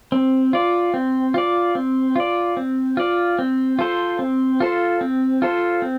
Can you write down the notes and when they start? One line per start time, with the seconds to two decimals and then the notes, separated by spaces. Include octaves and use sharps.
0.12 C4
0.53 F4 D5
0.94 C4
1.34 F4 D5
1.75 C4
2.16 F4 D5
2.57 C4
2.97 F4 D5
3.39 C4
3.79 F4 A4 C5
4.19 C4
4.60 F4 A4 C5
5.01 C4
5.42 F4 A4 C5
5.82 C4